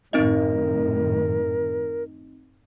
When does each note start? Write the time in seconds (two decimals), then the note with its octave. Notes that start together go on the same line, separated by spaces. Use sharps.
0.13 F#2 A2 D#3 C4 D#4 A#4 D#5